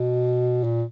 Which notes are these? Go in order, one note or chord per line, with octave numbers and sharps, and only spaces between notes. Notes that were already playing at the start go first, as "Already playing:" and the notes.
Already playing: B2
A#2